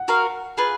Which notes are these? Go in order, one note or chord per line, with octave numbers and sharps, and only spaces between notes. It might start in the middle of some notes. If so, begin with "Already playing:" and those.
Already playing: F#5
F#4 A#4 F5
F4 G#4 B4